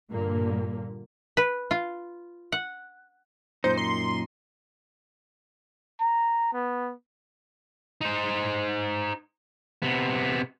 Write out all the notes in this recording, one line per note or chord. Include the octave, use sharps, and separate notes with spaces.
G2 A#2 D3 A#3
B4
F4
F#5
F#2 A#2 D#4 C5
C6
A#5
B3
D#4 C5
C3 B3